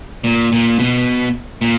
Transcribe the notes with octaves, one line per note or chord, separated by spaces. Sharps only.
A#2
A#2
B2
A#2